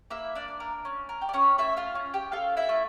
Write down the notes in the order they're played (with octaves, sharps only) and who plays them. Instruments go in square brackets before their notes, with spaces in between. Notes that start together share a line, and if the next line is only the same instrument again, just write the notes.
[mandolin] A#3 E4 E5
D4 D5
D4
A#4
C#4
A#4
G4
D5
C#4 C#5
A3 E4 E5
F4 F5
C#4
G4 G5
F4 A4 F5
E4 E5
A3